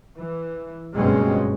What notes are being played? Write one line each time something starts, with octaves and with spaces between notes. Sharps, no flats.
E3
F#1 G2 B2 G#3 C4 C#4